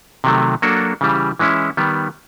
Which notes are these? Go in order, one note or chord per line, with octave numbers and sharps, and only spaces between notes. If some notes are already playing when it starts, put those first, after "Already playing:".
C3 D#3 F#3 A3
F#3 A#3 D4 F#4 A4
C#3 E3 G3
E3 G#3 C#4 E4
D#3 G3 B3